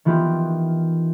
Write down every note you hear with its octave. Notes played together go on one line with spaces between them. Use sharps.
D#3 E3 B3 F4 G4